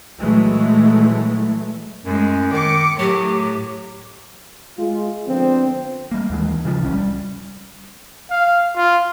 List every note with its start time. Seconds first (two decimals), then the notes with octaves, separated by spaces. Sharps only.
0.21 A#2 E3 F#3 G#3 A3
2.06 F#2 A2 G#3
2.52 D#3 D6 C#7
2.99 A2 F#3 G4
4.78 G#3 F4
5.27 D3 F3 B3 C4
6.11 G3 A#3
6.30 D#2 E3 G#3
6.65 C#3 E3 F3
6.81 D1 C2 C#4
6.93 G3
8.30 F5
8.76 F4